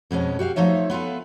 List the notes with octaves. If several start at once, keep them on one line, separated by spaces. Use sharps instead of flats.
F2 B2 G#3 C#4
F#4 G4 E5 F5
F3 A3 D#4 C#5 E5
B3 F4 A4 B4